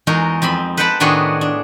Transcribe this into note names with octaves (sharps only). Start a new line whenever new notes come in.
E2 G#3 D#4 F#4 A#4
F2 C4 B5 C6
B4 C5 F#5 G5 A5 B5
A2 D#3 B3 D4 F#4 G#4
D4